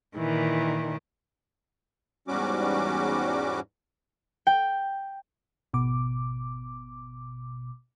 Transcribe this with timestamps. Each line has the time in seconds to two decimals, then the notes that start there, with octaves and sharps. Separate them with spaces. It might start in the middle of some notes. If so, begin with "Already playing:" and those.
0.17 A#2 D#3 E3
2.28 E2 G#2 G3 C#4 F#4 D6
4.47 G5
5.73 G#1 B2 D6